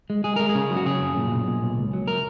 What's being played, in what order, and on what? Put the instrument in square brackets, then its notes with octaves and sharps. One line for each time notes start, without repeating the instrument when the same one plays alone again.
[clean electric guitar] G#3
G#3 G#4
G#3 A#4
G#4
C#3
F#3
F#4
C#3 G#4
F#2
A#2
B1
A#2
B1
C#2
F#3
A#4